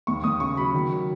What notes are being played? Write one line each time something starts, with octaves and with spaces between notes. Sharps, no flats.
D#2 C#6
D#2 D#6
C#3 C#6
F#3 B5
D#3
F#3